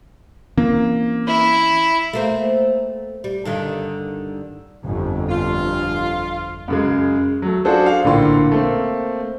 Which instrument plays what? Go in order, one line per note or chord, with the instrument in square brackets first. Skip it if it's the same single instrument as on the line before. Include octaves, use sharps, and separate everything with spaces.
[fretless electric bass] E3 C4 C#4 [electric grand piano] A#3
[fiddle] E4
[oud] A3 A#3 C4
G3
G2 D3 D#3
[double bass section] G1 F2
[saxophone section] F4
[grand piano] F#2 C#3 G#3
F#3 A3
D4 F4 F#4 G#4 A4 C5
F5
A#1 A2 D3 A#3 F4 C6
A3 A#3 C4